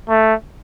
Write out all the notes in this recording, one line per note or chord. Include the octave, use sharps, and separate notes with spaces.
A3